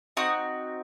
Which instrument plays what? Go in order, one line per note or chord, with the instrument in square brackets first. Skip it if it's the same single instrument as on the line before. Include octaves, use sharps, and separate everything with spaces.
[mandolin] C4 D#4 F#4 D#6